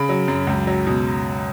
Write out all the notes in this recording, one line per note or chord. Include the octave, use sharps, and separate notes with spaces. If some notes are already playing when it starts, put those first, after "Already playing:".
Already playing: C#3 B5
F#3
F#2
C#2
F#3
B2